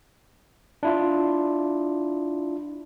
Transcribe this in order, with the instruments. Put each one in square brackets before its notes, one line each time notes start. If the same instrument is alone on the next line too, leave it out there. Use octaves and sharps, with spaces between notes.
[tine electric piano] D4 E4 F4